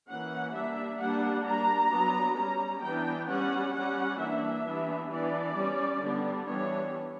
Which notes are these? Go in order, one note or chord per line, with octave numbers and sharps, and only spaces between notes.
E3 A#3 C#4 F#5
G3 A#3 D4 E5
G3 A#3 D4 F#5
G3 A#3 D4 A#5
F#3 B3 D4
G3 C#4 A#5
E3 B3 D4 G5
G3 C#4 F#5
G3 C#4 F#5
E3 A#3 D4 E5
E3 G3 B3 D4
E3 B3 D4 D5
G3 C#4
D3 G3 B3 D4
E3 G3 B3 D4 C#5